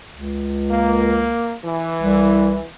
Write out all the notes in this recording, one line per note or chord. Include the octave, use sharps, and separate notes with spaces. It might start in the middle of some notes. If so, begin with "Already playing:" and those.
C#2
A#3
E3
C2